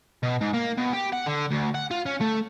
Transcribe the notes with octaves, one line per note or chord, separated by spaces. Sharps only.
B2
G#2
A#3
B2
G4
F#5
D3
D2
F#5
F4
C#4
A3